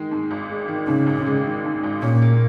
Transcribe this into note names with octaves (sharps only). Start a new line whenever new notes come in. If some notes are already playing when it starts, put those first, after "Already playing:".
Already playing: D#3 G#3
G#2
G#1
G#3
D#3
G#2 C#3
G#1
G#3
D#3
G#2
G#1
A#2 C#4
A#3